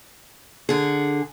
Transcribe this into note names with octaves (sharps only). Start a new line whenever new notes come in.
D3 G#4